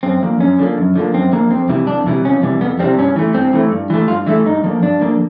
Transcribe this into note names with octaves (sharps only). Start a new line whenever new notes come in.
F#2 C4
D3 F3 A#3
F#2 C#4
D3 F3 A#3
F#2
D3 F3 A#3
F#2 C4
D3 F3 A#3
F2 C4
C3 E3 G3
F2 D4
C3 E3 G3
F2 C#4
C3 E3 G3
F2 B3
C3 E3 G3 C4
G2 C#4
E3 A3
G2 C4
E3 A3
G2
E3 A3
G2 F4
E3 A3 E4
G2 D#4
D3 F3 A#3
G2 D4
D3 F3 A#3